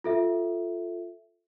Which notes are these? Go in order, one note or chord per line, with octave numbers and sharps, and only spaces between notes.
F4 A4 E5